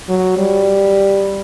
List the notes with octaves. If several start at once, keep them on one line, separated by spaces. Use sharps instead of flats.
F#3
G3